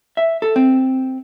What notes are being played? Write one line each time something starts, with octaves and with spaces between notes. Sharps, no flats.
E5
A4
C4